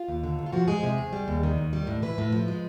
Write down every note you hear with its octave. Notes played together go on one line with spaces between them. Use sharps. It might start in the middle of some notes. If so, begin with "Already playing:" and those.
Already playing: F4
D#2
D3
D#2
F4
F3 F#4
G#3 G#4
C3
E2
G3
D#2
D#3
D#2
G3
A2
E3 B4
A2
F3
G#3